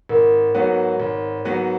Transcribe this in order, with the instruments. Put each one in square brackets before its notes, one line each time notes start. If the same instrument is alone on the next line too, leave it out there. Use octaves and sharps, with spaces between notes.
[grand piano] G#1 [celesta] A#4
[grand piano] G#2 F#3 B3 F#4 [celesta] C#5
[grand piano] G#1
G#2 F#3 B3 F#4